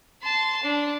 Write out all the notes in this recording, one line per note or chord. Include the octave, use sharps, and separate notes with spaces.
A5 C6
D4